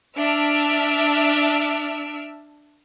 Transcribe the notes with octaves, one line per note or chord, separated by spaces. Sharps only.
D4 E5 E6 F6 D7